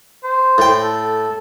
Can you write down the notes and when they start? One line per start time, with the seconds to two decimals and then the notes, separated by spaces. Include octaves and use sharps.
0.24 C5
0.58 A2 G5
0.81 A4